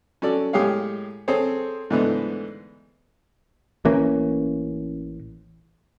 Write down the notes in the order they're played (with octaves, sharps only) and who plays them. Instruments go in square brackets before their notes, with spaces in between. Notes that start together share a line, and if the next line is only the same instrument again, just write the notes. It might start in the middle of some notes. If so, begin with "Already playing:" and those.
[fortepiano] C#4 F#4 A4 D5
A2 G#3 G4 G#4 C#5 F5
C4 G#4 A4 C5 C#5
G#2 D3 E3 A3 B3
[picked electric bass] A1 E3 A#3 C#4